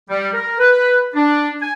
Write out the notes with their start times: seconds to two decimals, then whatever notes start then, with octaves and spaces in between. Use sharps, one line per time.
0.09 G3
0.33 A#4
0.59 B4
1.15 D4
1.61 G#5